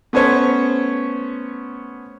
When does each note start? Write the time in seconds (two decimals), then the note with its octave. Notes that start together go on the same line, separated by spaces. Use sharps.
0.13 A3 B3 C#4 C5 C#5